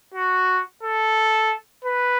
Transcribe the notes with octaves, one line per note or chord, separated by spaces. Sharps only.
F#4
A4
B4